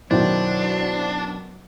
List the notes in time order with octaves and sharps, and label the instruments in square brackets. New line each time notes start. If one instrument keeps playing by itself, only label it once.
[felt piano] F#2 B2 D#3 [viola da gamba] F#3 [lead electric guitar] D4 [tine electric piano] E4 C5 D5